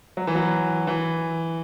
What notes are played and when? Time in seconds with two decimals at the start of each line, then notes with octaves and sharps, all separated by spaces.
0.17 F#3
0.27 E3
0.35 F#3
0.87 E3